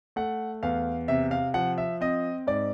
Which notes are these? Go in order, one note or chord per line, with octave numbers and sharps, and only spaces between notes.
A3 F#5
E2 F5
C3 E5
F5
F3 F#5
E5
C4 D#5
G#2 D5